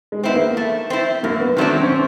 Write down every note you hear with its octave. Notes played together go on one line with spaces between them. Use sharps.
G#3
B3 C4 E4
A#3
A3
C4 E4
F#2 A#3
B3
D#3 F#3 A3 C4 D4
C4
C#4
C4